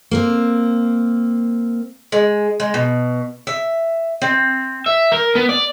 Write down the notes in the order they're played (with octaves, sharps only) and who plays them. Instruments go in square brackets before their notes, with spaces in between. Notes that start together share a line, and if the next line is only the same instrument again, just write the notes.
[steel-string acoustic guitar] A#3 C4
[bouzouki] G#3
G#3
B2
E5
C4
[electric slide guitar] E5
A#4
B3
D5